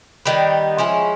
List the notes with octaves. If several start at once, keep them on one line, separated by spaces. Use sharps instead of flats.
D#3 G3 B3
F3 G#3 C#4 E4